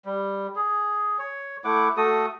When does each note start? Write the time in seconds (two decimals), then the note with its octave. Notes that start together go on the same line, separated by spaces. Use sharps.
0.05 G3
0.56 G#4
1.19 C#5
1.64 A3 E4 F#5 D6
1.97 A3 F#4 A4 D#6